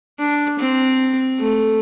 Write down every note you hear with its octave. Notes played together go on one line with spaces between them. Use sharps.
D4
C4
A3